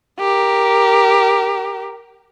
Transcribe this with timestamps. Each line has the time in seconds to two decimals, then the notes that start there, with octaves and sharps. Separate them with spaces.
0.19 G4 A#4